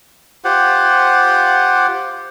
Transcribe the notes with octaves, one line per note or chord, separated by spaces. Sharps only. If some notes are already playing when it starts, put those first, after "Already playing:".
F4 G4 C5 F#5